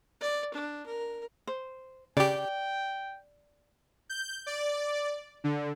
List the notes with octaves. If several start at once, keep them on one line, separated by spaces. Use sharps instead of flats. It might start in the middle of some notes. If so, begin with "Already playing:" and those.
D5
D4
A#4
C5
C#3 G4 D5 G5
G6
D5
D3